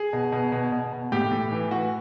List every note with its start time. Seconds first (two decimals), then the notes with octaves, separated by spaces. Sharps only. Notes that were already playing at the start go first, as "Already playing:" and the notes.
Already playing: G#4
0.13 B2
0.32 B2
0.52 B2
0.72 B2
0.93 B2
1.12 A2 G4
1.32 A2
1.51 E3
1.71 E3 F#4